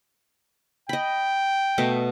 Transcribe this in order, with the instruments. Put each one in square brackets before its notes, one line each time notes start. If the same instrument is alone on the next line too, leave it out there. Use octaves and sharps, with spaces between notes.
[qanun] D#5 B5 [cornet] G5
[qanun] B2 A3 D#5